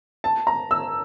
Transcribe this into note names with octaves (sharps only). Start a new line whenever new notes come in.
A5
A#5
E6